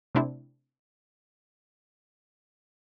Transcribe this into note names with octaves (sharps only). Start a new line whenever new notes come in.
C3 A3 C4 D4 E4